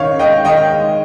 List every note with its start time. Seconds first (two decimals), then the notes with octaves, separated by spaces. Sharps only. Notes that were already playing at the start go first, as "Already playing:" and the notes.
Already playing: D#3 C#4 C#5 F5
0.19 G#3 D#5 G5
0.45 D#3 D#5 G5
0.71 G#3